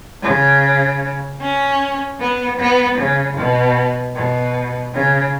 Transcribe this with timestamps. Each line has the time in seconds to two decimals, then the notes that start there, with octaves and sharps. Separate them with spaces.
0.23 C#3
1.41 C#4
2.19 B3
2.59 B3
2.98 C#3
3.37 B2
4.15 B2
4.94 C#3